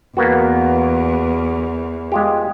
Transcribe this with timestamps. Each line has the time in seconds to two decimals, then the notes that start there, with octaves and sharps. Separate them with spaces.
0.17 E2 A#3 B3 F#4
2.12 G#3 F4 G4